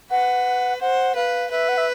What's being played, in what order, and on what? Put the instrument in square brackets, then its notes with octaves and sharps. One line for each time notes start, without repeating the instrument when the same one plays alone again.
[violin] B4 [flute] F#5
[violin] C5 [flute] F#5
[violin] B4 [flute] F5
[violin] B4 [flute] E5
[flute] F#5
E5